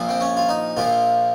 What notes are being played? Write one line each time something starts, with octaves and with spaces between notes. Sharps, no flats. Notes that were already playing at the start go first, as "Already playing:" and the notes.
Already playing: A#1 A#2 F3
C4
C#4
F4
D#4
A#1 A#2 F3 F4